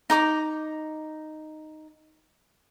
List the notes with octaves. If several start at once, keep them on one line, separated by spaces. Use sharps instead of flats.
D#4 A#5 D6